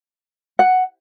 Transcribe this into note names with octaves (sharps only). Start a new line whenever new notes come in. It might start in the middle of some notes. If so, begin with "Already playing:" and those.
F#5